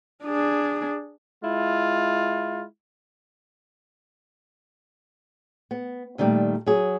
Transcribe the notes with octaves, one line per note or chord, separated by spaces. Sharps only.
D4 G#4
G#3 E4 F4
B3
A#2 D3 D#3 G3 A3
F#3 F#4 G#4